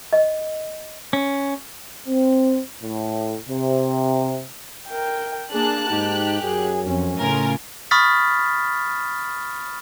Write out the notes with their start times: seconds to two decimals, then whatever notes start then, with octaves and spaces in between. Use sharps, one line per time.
0.13 D#5
1.13 C#4
2.07 C4
2.83 A2
3.48 C3
4.89 A#4 G5
5.52 A#3 D4 G#4 A5 F#6
5.90 G#2 D#4 G4
6.41 F#2 F#3 G#4
6.86 F2 C#4
7.20 A2 C#3 F4 A#4 G#5
7.91 B5 C#6 D#6 F6 A6 B6